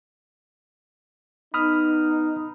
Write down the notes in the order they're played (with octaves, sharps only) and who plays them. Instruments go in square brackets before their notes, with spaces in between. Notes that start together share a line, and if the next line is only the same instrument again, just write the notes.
[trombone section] B3 D#4 [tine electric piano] B5 D#6 F6